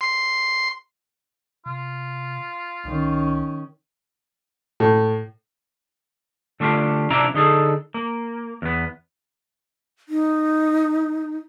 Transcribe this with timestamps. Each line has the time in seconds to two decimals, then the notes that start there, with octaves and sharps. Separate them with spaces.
0.01 C6
1.66 C3 F4
2.85 C2 D#3 C#4
4.80 A2
6.60 D3 A3 D4 F4 G4
7.10 C3 F3 D4 E4 D5 A#5
7.34 D3 D#4 G#4 A4
7.94 A#3
8.62 E2 B3
10.09 D#4